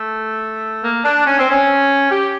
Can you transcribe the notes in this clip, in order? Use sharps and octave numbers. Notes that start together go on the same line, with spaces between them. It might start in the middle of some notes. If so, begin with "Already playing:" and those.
Already playing: A3
A#3
D4
C#4
C4
C#4
G4